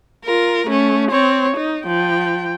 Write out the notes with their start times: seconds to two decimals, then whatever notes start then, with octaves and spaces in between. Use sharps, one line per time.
0.25 F4 A#4
0.67 A3 C#4
1.11 C4 C#5
1.56 D#4
1.85 F3 G5